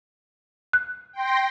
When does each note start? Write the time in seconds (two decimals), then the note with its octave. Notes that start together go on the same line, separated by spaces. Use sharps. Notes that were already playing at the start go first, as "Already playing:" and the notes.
0.73 F#6
1.13 G5 C6 A#6